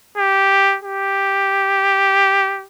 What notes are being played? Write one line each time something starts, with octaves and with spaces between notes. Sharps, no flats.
G4
G4